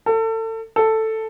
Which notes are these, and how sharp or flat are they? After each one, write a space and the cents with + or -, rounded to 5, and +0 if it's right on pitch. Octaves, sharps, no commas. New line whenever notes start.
A4 +30
A4 +5